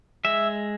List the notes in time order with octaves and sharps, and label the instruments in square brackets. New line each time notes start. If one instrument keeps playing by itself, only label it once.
[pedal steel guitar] G#3 E5